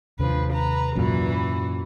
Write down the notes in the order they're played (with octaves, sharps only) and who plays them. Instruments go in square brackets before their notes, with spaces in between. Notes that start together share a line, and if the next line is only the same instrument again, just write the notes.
[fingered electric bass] D#2 C3 D4 [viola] F3 B4
[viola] B4 A#5
[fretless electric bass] F#2 A#2 [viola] E3 F#4